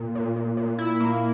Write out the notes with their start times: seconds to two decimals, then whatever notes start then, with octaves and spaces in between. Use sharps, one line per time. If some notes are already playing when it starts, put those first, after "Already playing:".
Already playing: A#2
0.15 A#2
0.36 A#2
0.57 A#2
0.79 E4
1.00 A#3